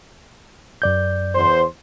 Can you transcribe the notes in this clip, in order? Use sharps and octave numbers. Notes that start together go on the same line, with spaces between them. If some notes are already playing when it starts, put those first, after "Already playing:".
F#2 D5 G6
E2 C5